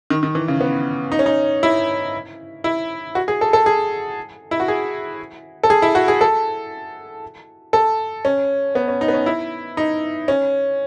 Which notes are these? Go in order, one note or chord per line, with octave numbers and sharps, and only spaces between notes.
D#3
D#3
E3
C#3
B3
D#4
C#4
D#4
E4
E4
F#4
G#4
A4
A4
G#4
E4
F#4
G#4
A4
G#4
E4
F#4
G#4
A4
A4
C#4
B3
C#4
D#4
B3
C#4
E4
D#4
C#4